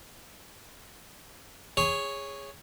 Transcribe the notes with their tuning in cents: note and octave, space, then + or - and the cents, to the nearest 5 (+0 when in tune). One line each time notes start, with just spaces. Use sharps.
G#4 -15 C#5 +0